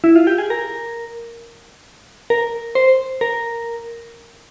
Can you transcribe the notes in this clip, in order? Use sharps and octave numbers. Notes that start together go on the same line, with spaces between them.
E4
F4
G4
G#4
A#4
A#4
C5
A#4